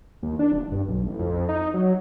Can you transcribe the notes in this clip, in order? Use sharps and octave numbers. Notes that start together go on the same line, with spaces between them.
D#2
D4
D#1
G2
B1
A1
F2
D#4
F#3